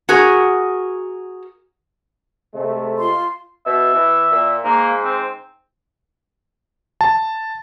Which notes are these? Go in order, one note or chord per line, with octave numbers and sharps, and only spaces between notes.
F#4 G#4 A#4
C3 G#3 A3
F4 C6
B2 E5
E3
A#2
G#2 A#3
C4
A5